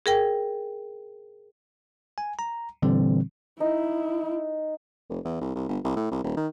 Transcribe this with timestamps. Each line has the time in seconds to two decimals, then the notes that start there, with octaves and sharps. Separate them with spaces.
0.06 G#4 A#4 G5
2.18 G#5
2.39 A#5
2.82 A#2 D3 E3 G3 C4
3.60 D#4 E4
5.09 F1
5.25 E2
5.41 C2
5.55 C2
5.69 G1
5.84 C2
5.96 A2
6.11 C2
6.24 D#1
6.37 D#3